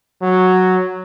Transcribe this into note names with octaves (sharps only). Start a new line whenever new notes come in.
F#3